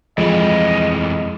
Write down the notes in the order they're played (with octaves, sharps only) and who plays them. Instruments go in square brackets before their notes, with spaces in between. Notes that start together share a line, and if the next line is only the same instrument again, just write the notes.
[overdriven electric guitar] F2 E3 [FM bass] F3 [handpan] G#3 [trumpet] D#5